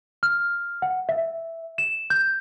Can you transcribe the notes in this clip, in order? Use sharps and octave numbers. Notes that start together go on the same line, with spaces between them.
F6
F#5
E5
E7
G6